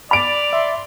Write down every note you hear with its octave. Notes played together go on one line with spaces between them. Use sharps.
D5 B5 D7 F7
E5 C6